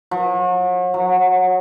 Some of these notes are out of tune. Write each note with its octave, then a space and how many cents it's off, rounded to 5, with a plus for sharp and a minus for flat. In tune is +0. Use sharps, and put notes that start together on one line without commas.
F#3 -40
F#3 -15